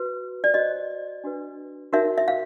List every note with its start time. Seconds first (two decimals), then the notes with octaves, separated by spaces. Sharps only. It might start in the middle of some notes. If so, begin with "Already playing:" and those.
Already playing: F#4 B4
0.44 D5
0.54 F#4 A4 C5 D#5
1.24 D4 F#4 B4
1.93 D#4 F#4 A#4 C#5 E5
2.18 E5
2.28 F5